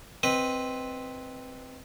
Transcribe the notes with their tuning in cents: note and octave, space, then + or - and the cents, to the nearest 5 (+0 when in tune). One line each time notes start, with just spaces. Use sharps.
C4 +0 B4 +0 D#5 +0